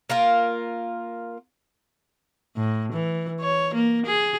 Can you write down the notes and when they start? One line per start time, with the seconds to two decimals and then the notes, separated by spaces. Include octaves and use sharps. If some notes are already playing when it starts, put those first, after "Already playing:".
0.10 A#3 F4 A#4
2.57 A2
2.93 E3
3.40 C#5
3.74 A#3
4.06 G#4